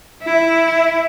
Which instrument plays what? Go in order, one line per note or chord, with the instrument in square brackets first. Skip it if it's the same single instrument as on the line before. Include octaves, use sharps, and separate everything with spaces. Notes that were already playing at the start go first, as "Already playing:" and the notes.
[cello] E4